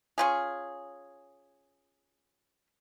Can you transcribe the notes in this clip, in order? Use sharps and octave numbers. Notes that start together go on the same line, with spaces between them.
C#4 F4 G#4